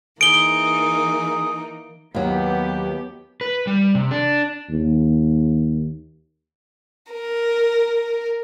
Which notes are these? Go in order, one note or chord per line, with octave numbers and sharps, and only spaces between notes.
E3 A#3 D#4 G#4 D7 G7
D#2 F#3 B3 G4
B4
G3
C3
D4
D#2
A#4